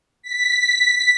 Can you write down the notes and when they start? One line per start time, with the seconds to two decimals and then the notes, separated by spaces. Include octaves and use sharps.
0.22 B6